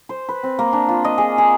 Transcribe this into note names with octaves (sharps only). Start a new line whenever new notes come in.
C5
B4
C4
A#3
D4
F4
D#5
G#4
G#4